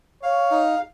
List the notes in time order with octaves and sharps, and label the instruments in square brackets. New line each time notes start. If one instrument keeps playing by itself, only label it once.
[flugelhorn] C#5 [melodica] F5
[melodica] D#4